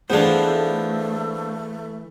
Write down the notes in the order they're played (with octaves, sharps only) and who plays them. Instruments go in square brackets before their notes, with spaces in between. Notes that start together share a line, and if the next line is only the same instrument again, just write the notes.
[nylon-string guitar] E3 G#4 A4 [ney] A3 [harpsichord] B3 D4 [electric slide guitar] C5 F5